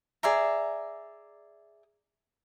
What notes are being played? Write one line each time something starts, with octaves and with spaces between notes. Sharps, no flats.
G#4 D5 E5 A#5